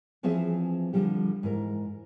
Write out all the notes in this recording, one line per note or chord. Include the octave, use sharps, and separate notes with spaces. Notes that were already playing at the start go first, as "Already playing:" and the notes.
E3 F3 C4 G#4 C5 E5
D3 F3 G3 G4
G#2 E3 A#4